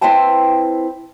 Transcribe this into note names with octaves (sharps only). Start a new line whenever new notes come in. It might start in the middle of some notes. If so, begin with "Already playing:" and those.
C4 E4 B4 C5 G5 A5